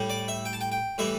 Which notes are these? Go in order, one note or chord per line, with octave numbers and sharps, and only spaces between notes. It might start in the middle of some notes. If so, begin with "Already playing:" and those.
Already playing: A2 G3
D5
E5
G5
A5
G5
G5
A2 E3 G3 E5